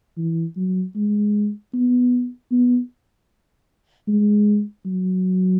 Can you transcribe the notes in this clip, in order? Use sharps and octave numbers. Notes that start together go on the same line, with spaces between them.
E3
F#3
G#3
B3
B3
G#3
F#3